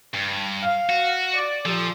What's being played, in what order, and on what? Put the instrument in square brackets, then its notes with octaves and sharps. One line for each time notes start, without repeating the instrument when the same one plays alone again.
[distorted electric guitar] G2
[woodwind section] F5
[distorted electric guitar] F#4
[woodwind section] D5
[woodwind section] A#2 G4 A4 [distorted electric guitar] F3